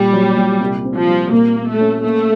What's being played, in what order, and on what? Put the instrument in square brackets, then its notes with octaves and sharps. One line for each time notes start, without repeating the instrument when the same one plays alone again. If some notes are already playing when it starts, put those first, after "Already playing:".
Already playing: [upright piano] A#2 [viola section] G3
[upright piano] F#3
A#2
C2
C4
[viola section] F3
[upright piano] G3
[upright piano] A#2 [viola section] A#3
[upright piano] A#2
[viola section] A3
[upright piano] C#4
[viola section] A3 [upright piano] A#3